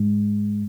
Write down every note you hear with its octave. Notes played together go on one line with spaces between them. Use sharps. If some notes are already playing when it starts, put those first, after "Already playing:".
Already playing: G#2